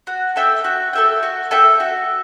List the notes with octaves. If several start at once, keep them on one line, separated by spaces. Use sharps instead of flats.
F#4
A4 E5 G5
F#4
A4 E5 G5
F#4
A4 E5 G5
F#4